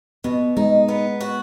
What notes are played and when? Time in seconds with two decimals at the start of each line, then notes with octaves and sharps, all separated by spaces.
0.24 B2 B3
0.57 G#3 D#4
0.88 B3
1.20 F#4